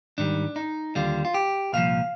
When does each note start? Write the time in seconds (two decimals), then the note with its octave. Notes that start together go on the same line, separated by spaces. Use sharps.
0.18 G#2 D#3 G3 D4
0.56 D#4
0.95 D#2 D3 G3 F4
1.25 F4
1.34 G4
1.73 C2 A#2 F3 F5